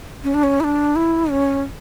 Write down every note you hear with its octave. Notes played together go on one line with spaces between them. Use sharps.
C#4
D4
C#4
E4
D4
E4
C#4